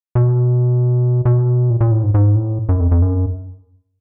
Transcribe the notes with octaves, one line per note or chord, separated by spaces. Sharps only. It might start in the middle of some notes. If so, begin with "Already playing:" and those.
B2
B2
A#2
A#2
A2
G#2
G#2
A2
F#2
F2
F2
F#2